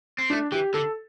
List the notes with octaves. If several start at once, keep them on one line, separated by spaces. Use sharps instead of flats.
C4
A3 D4
E3 G4
D3 A4